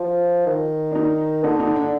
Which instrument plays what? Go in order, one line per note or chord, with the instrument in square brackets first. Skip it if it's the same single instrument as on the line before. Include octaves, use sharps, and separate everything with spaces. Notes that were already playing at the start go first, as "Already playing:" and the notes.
Already playing: [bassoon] F3
D#3
[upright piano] D4
D#4
[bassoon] D3 [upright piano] D#4
[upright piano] D#4
D4